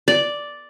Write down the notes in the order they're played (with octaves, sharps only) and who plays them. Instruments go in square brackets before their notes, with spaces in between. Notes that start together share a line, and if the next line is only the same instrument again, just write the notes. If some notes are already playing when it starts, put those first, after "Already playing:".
[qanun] D5